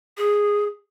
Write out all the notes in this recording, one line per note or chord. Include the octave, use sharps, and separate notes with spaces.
G#4